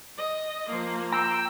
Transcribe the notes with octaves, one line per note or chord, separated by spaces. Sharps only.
D#5
F3 A#3
G5 A#5 E6